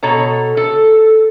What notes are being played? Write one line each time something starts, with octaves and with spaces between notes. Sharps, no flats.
B2 A4 C#5 A#5
A4